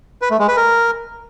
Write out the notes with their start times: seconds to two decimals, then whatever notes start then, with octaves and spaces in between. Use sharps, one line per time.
0.22 B4
0.30 A3
0.39 G#3
0.48 B4
0.57 A#4